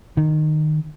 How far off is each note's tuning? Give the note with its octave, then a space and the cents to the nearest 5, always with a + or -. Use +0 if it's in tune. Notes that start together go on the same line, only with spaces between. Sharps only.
D#3 -20